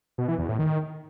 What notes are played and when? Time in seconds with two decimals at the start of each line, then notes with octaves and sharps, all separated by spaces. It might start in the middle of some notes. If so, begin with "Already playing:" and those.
0.18 B2
0.28 E3
0.39 E2
0.49 A2
0.59 D#3